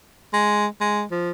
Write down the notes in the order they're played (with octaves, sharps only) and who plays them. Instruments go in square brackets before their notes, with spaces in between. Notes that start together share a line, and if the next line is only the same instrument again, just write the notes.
[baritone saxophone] G#3
G#3
F3